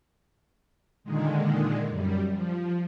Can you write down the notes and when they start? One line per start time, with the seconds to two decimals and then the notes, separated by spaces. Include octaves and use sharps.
1.04 A#2 D3 D#3 G#3
1.88 F#2 G3
2.30 F3